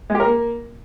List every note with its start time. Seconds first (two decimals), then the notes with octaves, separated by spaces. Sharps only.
0.10 G#3
0.15 G4
0.20 A#4
0.25 A#3